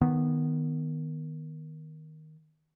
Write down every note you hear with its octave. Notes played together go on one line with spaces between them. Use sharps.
D#3 B3